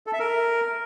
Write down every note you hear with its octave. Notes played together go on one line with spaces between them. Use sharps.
A4
E5
A#4